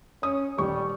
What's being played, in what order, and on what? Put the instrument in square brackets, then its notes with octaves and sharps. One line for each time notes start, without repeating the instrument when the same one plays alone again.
[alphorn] C#4 [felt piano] D#6
[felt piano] D#1 C#6 [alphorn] G3